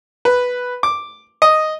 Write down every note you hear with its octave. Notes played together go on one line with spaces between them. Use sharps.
B4
D6
D#5